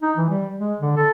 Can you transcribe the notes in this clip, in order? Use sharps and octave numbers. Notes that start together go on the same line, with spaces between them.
D#4
E3
G3
G#3
D3
A4